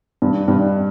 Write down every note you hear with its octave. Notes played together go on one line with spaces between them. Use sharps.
G2
G2